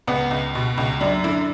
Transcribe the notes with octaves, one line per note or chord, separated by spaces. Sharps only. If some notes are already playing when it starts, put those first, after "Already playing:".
C#2 B3
C#2
B2
C#2
F#2 D4
D3 E4